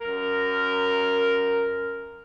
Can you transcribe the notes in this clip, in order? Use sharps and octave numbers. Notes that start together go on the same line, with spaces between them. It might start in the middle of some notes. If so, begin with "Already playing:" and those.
F#2 A#4